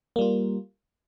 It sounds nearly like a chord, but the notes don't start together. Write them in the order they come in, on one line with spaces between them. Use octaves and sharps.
A#3 G3 F4